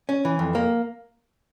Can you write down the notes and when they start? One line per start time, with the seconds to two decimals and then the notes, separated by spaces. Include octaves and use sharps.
0.09 C#4
0.25 E3
0.39 F2
0.55 A#3